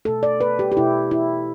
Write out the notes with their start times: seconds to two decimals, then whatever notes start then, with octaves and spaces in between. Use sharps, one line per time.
0.05 B2 A3 A4
0.23 D5
0.41 B4
0.59 G4
0.72 G4
0.77 B2 A3 E4
1.11 E4